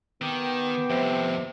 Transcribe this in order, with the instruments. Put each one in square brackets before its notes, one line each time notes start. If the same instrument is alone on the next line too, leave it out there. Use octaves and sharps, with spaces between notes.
[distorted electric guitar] D#3 [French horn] B3 [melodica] G4 G5
[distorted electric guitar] F2 A2 [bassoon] C3